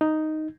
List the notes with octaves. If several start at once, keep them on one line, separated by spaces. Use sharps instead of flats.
D#4